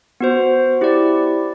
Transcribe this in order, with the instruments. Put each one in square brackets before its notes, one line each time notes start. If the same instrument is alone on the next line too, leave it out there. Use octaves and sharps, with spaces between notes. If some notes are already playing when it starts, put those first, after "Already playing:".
[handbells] B3 F#4 C5
E4 G4 D5